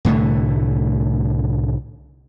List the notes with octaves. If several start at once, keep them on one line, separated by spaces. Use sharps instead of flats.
C2 A2 D3 A3